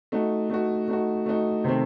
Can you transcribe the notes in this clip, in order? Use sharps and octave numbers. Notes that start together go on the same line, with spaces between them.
A3 D#4 F#4
A3 D#4 F#4
A3 D#4 F#4
A3 D#4 F#4
C3 D#3 A3 C4